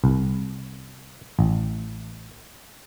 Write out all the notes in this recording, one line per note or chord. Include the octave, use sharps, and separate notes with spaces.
C2
A1